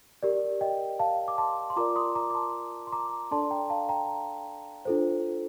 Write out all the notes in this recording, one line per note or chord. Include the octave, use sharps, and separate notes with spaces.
G4 A#4 D5
D#5 G5
F5 A5
D6
A5 C6
C6
F4 A#4 D5 A#5 D6
C6 D#6
A#5 D6
D6
A5 C6
C6
A#5 D6
D4 A4 D5 A5 C6
G5 A#5
F5 A5
G5 A#5
D4 F4 A4 C5